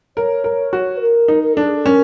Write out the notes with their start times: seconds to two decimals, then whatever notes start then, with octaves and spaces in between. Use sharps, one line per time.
0.17 A#4 C#5
0.44 A#4
0.73 F#4
0.97 B4
1.01 A#4
1.28 D#4
1.43 A#4
1.53 D4 A4
1.65 G#4
1.74 A4
1.86 C#4 A#4